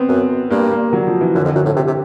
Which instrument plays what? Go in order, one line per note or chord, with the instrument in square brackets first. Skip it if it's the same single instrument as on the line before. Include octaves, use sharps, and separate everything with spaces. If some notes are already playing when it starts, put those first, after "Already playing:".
Already playing: [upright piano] B3 C4
[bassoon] F#2
[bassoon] G2 [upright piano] A#3
[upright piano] A#3
F#3
F3
E3
[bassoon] F#2 [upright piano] D3
[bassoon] F2
F#2
A2
C3
C3